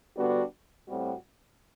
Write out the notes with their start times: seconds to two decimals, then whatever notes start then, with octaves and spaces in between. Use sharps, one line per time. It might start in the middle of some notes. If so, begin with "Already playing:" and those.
0.16 D3 G3 B3 D4 F#4
0.88 A2 G3 C4 F#4